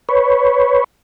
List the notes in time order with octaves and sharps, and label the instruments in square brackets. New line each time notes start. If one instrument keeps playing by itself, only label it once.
[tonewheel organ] B4 C#5